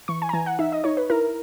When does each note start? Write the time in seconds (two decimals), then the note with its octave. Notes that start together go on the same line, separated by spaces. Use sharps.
0.08 E3 C#6
0.22 G#5
0.29 A#5
0.33 E3 G#5
0.46 F#5
0.59 D#4 E5
0.72 D#5
0.84 D#4 C#5
0.97 B4
1.10 E4 A#4